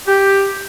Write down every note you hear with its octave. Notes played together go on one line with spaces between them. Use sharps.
G4